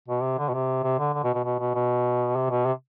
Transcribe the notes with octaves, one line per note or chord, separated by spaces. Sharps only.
B2
C3
D3
B2
C3
C3
D3
D3
B2
B2
B2
B2
B2
C3
B2
C3